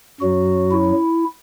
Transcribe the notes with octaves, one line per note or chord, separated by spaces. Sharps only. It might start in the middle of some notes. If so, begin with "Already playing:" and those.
F#2 F#3 F#4
E4